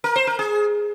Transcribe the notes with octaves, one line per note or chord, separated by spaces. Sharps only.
A#4
C5
A#4
G#4